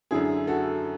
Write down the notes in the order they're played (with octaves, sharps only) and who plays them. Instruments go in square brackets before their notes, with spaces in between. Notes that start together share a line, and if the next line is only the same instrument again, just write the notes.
[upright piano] F#2 D3 E4 G#4
F#4 A4